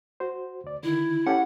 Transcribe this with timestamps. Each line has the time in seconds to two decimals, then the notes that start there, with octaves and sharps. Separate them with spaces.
0.20 F#4 C5
0.64 D2 D5
0.83 D3 D#3 E4
1.27 C#4 G4 A4 F#5